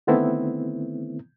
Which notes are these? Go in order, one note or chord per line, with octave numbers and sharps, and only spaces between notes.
D3 D#3 A3 B3 C4 E4